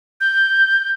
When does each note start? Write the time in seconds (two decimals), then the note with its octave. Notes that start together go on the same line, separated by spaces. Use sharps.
0.21 G6